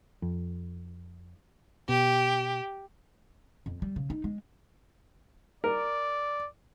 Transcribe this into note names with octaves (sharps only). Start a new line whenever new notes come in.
F2
B2 G4
F2
G3
C#3
D#4
G#3
A#4 D5